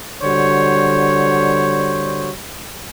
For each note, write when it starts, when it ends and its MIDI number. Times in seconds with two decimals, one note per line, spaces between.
0.22 2.31 50
0.22 2.31 55
0.22 2.31 66
0.22 2.31 72
0.22 2.31 73